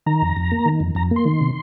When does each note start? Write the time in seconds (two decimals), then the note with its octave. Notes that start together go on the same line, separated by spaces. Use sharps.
0.06 D#3 A#5
0.22 F2
0.36 F2
0.51 A#3
0.65 D#3
0.80 F2
0.95 F2 A#5
1.11 A#3 C6
1.25 D#3
1.41 C3